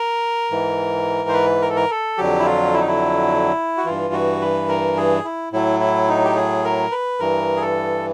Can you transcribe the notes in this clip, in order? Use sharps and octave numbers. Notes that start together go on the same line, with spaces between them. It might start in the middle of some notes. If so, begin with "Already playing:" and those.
Already playing: A#4
G#2 E3
C5
B4
A#4
A4
A#4
A4
F2 D3 F#3 G4
E4
F4
E4
D#4
E4
F#4
G2 E3 F4
F#4
B4
A#4
G#4
E4
A2 F#3 E4
E4
D#4
G4
G#4
A#4
B4
G2 E3 A#4
G#4
A4